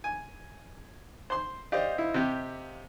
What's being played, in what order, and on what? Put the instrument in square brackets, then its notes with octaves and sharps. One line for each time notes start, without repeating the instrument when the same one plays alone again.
[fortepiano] G#5
C5 C6
[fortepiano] G4 D5 [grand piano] C5 D#5 F5
[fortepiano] E4
C3 G4